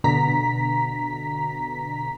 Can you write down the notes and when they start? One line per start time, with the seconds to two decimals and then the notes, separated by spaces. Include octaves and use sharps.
0.04 B2 D3 A#5 B6